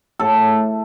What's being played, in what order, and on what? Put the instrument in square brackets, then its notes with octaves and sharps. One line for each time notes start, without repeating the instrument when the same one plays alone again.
[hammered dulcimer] A2 A4